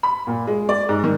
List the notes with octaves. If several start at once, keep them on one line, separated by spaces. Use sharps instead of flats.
B5
A#2
G#3
D5
G#2
D#3